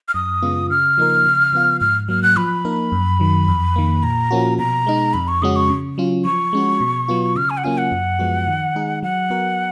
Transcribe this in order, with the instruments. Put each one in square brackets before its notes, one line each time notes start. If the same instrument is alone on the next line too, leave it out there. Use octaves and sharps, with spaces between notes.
[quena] F6
[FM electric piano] F#2 [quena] D#6
[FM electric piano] C#3 G#3 B3 F4
[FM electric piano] C#3 [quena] F6
[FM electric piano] F3 A#3 D#4 A#4
C#3
F3 B3 F4
[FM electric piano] G#2 [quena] F6
[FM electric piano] F#3 A#3 [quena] F6
[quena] F#6
[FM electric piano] F3 [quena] B5
[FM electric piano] A#3 D#4 A#4
F#2
D#3 F#3
F2
D#3 A#3
[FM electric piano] A#2 [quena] A#5
[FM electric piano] F3 A#3 C#4 F#4
[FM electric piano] B2 [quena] A#5
[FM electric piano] G#3 D#4
[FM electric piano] F2 [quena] B5
[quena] C#6
[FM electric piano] C#3 G#3 C#4 F#4 [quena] D#6
[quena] C#6
[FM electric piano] C#3
F#3 C#4 F4
[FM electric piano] F3 [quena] C#6
[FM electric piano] G#3 C#4 F#4
B2
F#3 B3 F4
[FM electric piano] C#3 [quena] F6
[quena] G#5
F#5
[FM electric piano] F#3 A#3 C#4 F4 [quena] G#5
[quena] F#5
[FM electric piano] F#2
F3 G#3 B3 F#4
D#3
G#3 D#4 G#4
[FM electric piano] F#3 [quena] F#5
[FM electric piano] B3 F#4 A#4